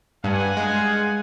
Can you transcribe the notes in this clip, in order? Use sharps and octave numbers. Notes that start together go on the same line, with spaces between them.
G2 F5 F#5 G#5
G#3